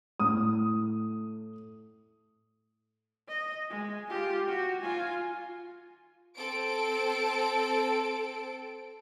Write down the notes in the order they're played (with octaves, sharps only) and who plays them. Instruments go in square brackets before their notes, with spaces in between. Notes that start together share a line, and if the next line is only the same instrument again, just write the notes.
[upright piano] A2 D#6
[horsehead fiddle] D#5
G#3
F4 G4
F#4
F4 G#5
[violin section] C4 A4 D7